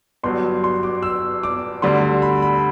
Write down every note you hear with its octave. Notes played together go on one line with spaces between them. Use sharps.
G1 G2 F#3 C6
C6
D6
E6
D6
D2 D3 G3 C6
B5
B5